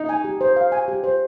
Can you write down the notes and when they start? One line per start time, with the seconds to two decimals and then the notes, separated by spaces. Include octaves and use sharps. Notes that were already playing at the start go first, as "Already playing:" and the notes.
Already playing: D#4
0.09 G#5
0.24 G4
0.41 C5
0.56 F5
0.72 G#5
0.88 G4
1.04 C5